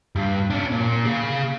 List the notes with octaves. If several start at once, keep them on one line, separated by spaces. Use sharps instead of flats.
G2
C#4 D4
A#2
G#4 F5